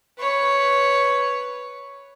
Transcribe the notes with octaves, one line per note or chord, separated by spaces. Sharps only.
B4 C#5